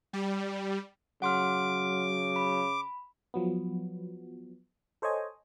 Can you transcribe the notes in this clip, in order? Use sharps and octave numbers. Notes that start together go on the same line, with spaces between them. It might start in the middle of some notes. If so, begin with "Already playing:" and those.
G3
C#3 F#3 F#5 C6 D6 F6
B5
F3 F#3 B3
A4 C5 C#5 D#5 G#5